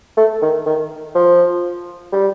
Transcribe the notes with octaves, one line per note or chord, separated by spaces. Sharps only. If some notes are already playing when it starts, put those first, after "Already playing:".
A3
D#3
D#3
F3
G3